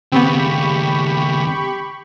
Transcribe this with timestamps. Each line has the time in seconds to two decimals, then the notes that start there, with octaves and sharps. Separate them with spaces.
0.12 D#2 C#3 B3 C4 G4 B5 C#6